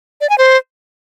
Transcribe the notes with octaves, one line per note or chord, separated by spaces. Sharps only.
D5
G#5
C5